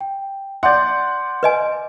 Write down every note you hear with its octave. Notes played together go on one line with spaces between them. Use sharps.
G5
D5 F#5 C6 G6
B4 D#5 G#5